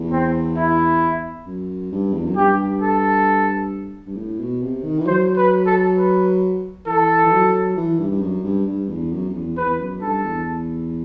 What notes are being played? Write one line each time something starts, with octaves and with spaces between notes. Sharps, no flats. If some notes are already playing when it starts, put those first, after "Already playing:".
Already playing: E2
C4
E4
F#2
G2
E2
F#2
G2 G4
A4
G2
A2
B2
C3
D#3
E3
F#3 C5
B4
A4
B4
E3 A4
E3
F#3
E3
G2
G2
F#2
G2
G2
E2
F#2
F#2
E2
E2 B4
F#2
G2 A4
E2